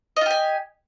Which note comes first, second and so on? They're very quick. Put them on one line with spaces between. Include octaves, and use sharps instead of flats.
D#5 F4 G4 G#5